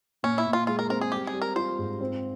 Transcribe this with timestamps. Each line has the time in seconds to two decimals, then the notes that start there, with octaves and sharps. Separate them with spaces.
0.23 A#2 C#4
0.38 E4
0.46 A#2
0.53 F4
0.67 G#3 F4
0.79 A#4
0.89 C4 A#4
1.01 G#4
1.12 G3 G4
1.27 G#4
1.34 G3
1.42 A#4
1.56 F4 C5
1.79 G#2
2.01 C4